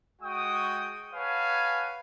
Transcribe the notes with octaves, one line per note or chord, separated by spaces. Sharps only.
G#3 F#4 G5 C#6 D#6
B4 C#5 F5 F#5 G#5 A5